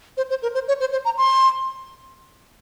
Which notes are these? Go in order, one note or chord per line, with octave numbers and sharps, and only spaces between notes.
C5
C5
A#4
C5
C#5
C5
C5
A#5
C6